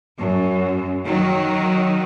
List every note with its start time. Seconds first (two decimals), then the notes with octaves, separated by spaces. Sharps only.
0.18 F#2
1.05 D#3 F#3